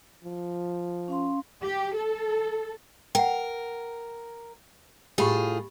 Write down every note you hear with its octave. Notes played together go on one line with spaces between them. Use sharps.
F3
C#4 F5 C6
G4
A4
A#4 F#5 G5
A2 F4 G4 G#4 B5 C#6